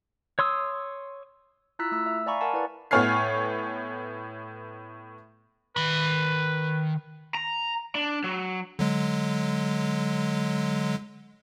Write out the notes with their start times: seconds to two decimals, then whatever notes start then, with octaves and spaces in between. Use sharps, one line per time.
0.39 C#5 C6 D#6 E6
1.79 E4 F4 A#5 E6 F#6 B6
1.92 A3 E6
2.06 E5
2.26 D5 F5 G#5 A#5 B5 C#6
2.41 A#4 F#5 G#5 A5
2.53 E4 B4 D5
2.91 A2 B3 C#5 G#5 F6 C7
5.77 D#3 B4 B5
7.35 A#5
7.95 D4
8.24 F#3
8.79 D3 F#3 G#3